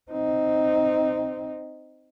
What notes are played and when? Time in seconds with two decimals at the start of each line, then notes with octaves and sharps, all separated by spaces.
0.11 C4 D#4